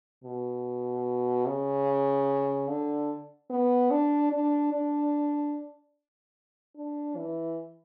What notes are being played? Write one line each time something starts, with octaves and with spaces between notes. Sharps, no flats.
B2
C#3
D3
B3
D4
D4
D4
D4
E3